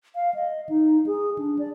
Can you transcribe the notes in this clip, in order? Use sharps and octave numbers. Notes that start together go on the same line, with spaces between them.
F5
D#5
D#4
G#4
D4
D5